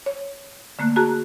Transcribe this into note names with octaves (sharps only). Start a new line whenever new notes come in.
C#5
D3 A3 A#3 F#6
F#4 G#4 A5 A#5 F#6